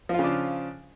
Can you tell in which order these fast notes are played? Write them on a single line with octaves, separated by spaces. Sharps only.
F3 F4 C#3 D4